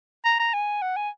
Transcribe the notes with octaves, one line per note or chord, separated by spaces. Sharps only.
A#5
A#5
G#5
F#5
G#5